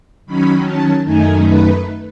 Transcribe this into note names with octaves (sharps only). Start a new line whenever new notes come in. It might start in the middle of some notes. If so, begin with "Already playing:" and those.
D#3 F#3 C#4 B5
A5
F#2 D#3 A3 D#4 G#5
B4